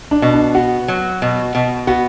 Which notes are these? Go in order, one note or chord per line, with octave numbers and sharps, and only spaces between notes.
D4
B2
D4
B3 F#4
F#3
B2
B2
B3 F#4